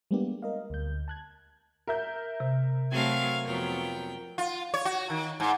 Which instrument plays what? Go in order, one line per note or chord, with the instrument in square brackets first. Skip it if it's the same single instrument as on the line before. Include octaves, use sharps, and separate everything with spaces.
[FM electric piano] G3 G#3 A#3 B3 D4 G4
A#4 D#5 F5
D2 G6
A5 F#6 G#6
[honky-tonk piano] A#4 E5 G6
[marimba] C3
[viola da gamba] F#3 A3 C4 [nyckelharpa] F5 G#5
[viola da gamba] F2 F#3 B3 [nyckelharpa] A#4 G5
[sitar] F4
C#5
F#4
D#3
G#2